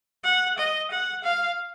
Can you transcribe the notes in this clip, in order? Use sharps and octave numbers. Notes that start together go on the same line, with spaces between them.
F#5
D#5
F#5
F5